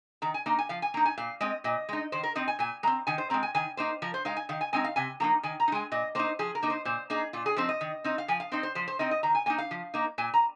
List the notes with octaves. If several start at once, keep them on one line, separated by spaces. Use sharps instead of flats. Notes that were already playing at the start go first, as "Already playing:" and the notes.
D#3 A#5
G#5
A#3 D#4 A#5
G#5
F3 F5
G#5
A#3 D#4 A#5
G#5
A#2 F5
G#3 C4 D#5
A#2 D#5
G#3 D#4
D#3 C5
A#4
C4 D#4 D#5
G#5
A#2 G#5
G#3 C4 A#5
D#3 G#5
C5
G#3 C4 A#5
G#5
D#3 G#5
A#3 D#4 C5
F3 A#4
C5
G#3 D#4 F5
G#5
D#3 F5
G#5
G#3 C4 D#4 G#5
F5
C3 G#5
F3 A#3 D#4 A#5
D#3 G#5
A#5
D#4
G#3 G#5
A#2 D#5
A#3 D#4 C5
F3 G#4
A#4
A#3 D#4
C5
A#2 C5
A#3 D#4 G#4
A#2 F4
G#4
F3 C4 D#4 C5
D#5
D#3
C4 D#4
F5
F3 G#5
F5
C4 D#4 C5
C5
F3 C5
C5
C4 D#4 D#5
D#5
D#3 A#5
G#5
A#3 D#4 G#5
F5
F3
A#3 D#4
A#2 G#5
A#5